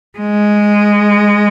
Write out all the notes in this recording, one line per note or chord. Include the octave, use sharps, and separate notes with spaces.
G#3